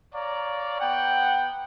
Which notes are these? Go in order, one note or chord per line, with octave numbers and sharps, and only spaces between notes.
C#5 D5 F5 A#5
B3 F#5 G5